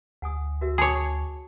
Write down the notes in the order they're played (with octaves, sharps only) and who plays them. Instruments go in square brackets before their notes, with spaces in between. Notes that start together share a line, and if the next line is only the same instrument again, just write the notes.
[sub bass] D2 [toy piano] F#5 G#5 D#6
[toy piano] F#4 A#4 E5
[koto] G#4 C#5 [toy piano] A5 D6